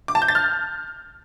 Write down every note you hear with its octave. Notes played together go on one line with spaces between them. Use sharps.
D6
A5
G6
A6
F6